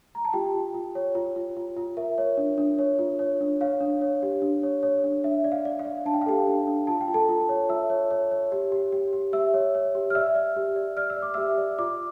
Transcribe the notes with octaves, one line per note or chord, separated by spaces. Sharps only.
A#5
A5
F4 G4 G5
F4
F4
C#5
F4
F4
F4
F4
A#4 E5
C#5
D4
D4
C#5
F4
C#5
D4
C#5 F5
D4
C#5
G4
D4
C#5
C#5
D4
D4 E5
D5
F5
D5
F5
D5
D4 A5
G5
F5
G4 A4 G5
D4
D4
F4 A5
G5
F4
A4 A5
F4
C#5
F4 E5 E6
C#5
C#5
C#5
G4
G4
G4
G4
G4 E5 E6
C#5
C#5
G4
F6
D5 E5 E6
D5
G4
D5
D5 F6
E6
D5
D6
G4 E5 E6
D5
F4 D5 D6